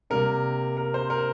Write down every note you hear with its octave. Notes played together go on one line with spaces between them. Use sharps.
C3 G3 A#3 A#4
A#4
C5
A#4